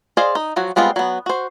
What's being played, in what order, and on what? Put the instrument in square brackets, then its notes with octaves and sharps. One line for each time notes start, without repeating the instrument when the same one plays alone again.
[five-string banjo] G#4 C5 D5 D#5 F5
D#4
F3 F#3 F#4
G3 G#3 B3 C4 F4
F#3 B3
F#4 C5